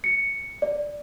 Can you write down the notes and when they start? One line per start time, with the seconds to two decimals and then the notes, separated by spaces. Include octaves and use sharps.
0.04 C#7
0.62 D5